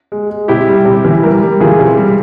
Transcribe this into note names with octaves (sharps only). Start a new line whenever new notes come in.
G#3
G#3
C3 E4 G4
G3
C3
E3
G3 G4 A#4
G3
E3 F4 G#4
C3
G3